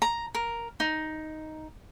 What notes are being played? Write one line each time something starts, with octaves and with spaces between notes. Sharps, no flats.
A#5
A#4
D#4